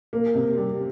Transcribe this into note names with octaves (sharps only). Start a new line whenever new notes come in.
A#3
C3
G3